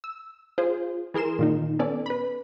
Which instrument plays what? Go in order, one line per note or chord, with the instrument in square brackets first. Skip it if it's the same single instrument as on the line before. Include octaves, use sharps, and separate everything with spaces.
[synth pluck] E6
F4 G#4 C5
E3 G#4 A#4 C6 E7
A#2 D#3 D#4
B3 C#4 A4 D5
B4 B5